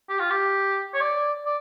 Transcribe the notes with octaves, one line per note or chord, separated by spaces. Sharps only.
G4
F4
G4
C#5
D5
D5